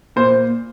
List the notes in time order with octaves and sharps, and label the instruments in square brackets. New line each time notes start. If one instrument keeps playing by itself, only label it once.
[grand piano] A#2 C5